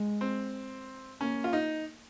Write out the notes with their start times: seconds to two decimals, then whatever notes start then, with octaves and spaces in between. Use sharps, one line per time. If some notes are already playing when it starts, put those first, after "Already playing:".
Already playing: G#3
0.21 C4
1.21 A#3 C#4
1.44 F4
1.53 D#4